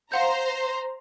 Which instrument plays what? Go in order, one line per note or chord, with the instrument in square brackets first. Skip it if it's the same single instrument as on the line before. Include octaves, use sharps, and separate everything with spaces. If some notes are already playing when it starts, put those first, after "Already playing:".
[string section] C5 A#5 [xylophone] F5 F#5 G6